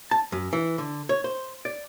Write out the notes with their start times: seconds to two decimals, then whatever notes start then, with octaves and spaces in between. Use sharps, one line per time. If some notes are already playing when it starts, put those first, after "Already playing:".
0.11 A5
0.32 F#2
0.53 E3
0.78 D3
1.09 C#5
1.24 C5
1.65 D5